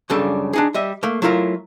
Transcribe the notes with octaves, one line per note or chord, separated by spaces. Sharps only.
C#2 F#2 C#3 G3 D4 A4
D4 D#4 G#4
G3 D#5 E5
A3 A#3
F#3 A3 E4 F4 A4 A#4